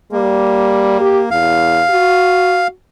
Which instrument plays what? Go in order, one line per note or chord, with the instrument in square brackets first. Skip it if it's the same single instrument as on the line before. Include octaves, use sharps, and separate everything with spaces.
[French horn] G3 [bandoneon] A#3
[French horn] G4
[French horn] E2 [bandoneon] F5
[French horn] F#4